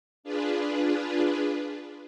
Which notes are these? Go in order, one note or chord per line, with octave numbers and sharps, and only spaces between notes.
D4 F4 G#4 B4